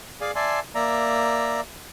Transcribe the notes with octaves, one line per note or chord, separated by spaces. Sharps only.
G#4 D5 F5 G#5
D5 E5 G#5 A5 C6
A#3 D5 E5 A#5